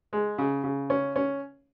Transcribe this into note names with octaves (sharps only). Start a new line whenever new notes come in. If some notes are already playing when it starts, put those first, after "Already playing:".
G#3
C#3
C#3
C#4
C#4